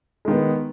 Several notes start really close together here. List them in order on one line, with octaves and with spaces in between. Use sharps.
G#3 D#3 B3